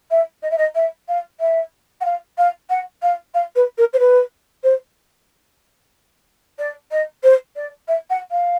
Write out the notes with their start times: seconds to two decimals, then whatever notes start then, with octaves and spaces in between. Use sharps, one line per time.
0.10 E5
0.42 D#5
0.50 E5
0.57 D#5
0.75 E5
1.08 F5
1.40 E5
2.00 F#5
2.04 F5
2.37 F5
2.69 F#5
3.02 F5
3.34 F5
3.55 B4
3.77 A#4
3.93 C5
3.99 B4
4.63 C5
6.58 D5
6.91 D#5
7.23 C5
7.56 D5
7.87 E5
8.09 F#5
8.31 F5